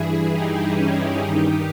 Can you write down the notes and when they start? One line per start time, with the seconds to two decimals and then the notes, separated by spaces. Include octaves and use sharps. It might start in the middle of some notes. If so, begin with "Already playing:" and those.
Already playing: G2 E3 E4 G#4
0.32 D#4 G4
0.75 C#4 E4
1.19 G2 D#3 D#4 G4